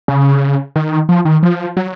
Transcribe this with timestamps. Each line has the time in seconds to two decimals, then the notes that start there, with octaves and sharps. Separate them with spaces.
0.08 C#3
0.76 D#3
1.09 F3
1.25 D#3
1.43 F3
1.77 F#3